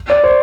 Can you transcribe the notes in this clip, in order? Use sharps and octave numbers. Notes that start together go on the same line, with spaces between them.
D5
C5